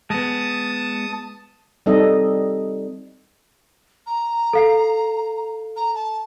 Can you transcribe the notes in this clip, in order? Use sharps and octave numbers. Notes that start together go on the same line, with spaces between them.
G#3 B3 A5 D#6
G3 C4 D#4 A4 D#5
A#5
A4 F5 C7
A#5
A5